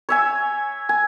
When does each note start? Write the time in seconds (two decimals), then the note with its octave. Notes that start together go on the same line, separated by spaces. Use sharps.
0.09 C#5 E5 G#5
0.89 G#5